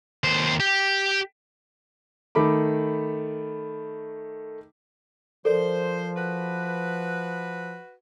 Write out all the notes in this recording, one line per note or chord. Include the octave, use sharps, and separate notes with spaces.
D#2 C5
G4
D#3 A3 B5 D6
F3 A4 A#4 C5 D5
F#4 B4